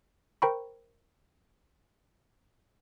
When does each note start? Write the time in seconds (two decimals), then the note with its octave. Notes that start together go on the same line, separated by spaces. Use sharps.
0.42 A#4 C5 G5 A#5 B5 C#6